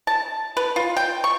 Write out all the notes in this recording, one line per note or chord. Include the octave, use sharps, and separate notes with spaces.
A5
B4
F4
G5
C#6